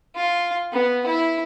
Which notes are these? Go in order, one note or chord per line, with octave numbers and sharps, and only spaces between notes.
F4
B3
E4